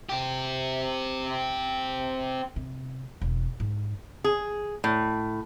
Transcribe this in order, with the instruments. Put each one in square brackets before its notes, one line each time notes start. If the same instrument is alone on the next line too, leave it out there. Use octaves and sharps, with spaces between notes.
[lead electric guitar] C4 G4
[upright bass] C3
E1
G#2
[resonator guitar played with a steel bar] G#4
A2